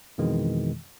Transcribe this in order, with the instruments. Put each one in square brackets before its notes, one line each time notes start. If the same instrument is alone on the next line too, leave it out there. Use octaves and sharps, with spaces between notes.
[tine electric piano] F2 B2 D#3 E3 G#3